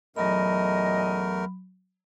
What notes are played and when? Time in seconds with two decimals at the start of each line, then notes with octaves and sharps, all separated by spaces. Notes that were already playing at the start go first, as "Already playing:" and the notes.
0.16 E2 A#2 F#3 A3 C#4 A#4 D#5 B5